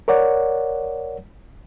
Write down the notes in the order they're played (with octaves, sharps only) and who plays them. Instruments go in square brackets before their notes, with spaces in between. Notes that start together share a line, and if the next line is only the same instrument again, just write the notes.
[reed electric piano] A#4 C#5 D5 F#5